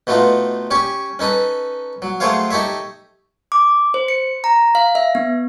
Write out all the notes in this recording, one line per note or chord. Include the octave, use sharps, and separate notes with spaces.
B2 A3 B3 D#4 F4
C#4 G4 C#5 C#6
C#4 D#4 A4 B4
F#3
F#3 A3 G#4 C5 C#5 F5
D#4 G4 A4 C#5 E5
D6
C5
C#7
A#5
F5
E5
B3